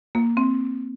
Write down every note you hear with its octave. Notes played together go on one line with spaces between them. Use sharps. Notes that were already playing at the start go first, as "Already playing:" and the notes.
A#3
C4